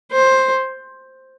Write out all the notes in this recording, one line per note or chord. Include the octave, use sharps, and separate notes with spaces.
C5